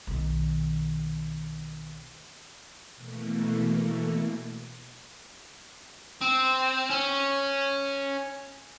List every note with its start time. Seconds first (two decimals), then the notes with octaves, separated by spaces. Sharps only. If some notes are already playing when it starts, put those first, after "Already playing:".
0.07 B1 D#3
2.95 B2 E3 A3 A#3
6.21 C4
6.90 C#4